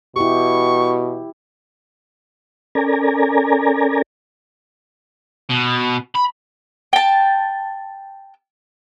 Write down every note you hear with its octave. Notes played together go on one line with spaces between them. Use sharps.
B2 E4 G4 C#6
C#4 A4 A#4 D5 G#5 A#5
B2
B5
G5 A5